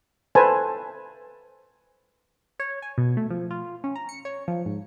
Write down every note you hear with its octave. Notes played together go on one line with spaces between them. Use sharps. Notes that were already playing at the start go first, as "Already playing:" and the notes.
A4 B4 C5 G#5 A5
C#5
G#5
B2
A3
F3
F4
C#4
A#5
C#7
C#5
F3
G#2